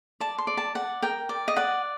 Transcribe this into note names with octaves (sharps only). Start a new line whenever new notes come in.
D5 A5
C6
D5
A5
D5 F#5
A#4 G5
D5
D#5
D5 F#5